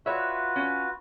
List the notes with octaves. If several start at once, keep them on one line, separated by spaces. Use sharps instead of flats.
F4 F#4 B4 C#5 E5
C#4